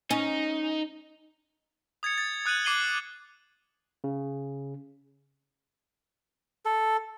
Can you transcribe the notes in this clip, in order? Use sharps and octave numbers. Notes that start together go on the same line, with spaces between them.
C#4 D#4
D#6 G#6 A6 C#7
A6
D#6 F#6 C#7 D#7 F#7
D6 C7 D#7 F#7 G7
C#3
A4